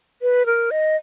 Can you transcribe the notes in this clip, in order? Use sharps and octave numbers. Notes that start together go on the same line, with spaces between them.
B4
A#4
D#5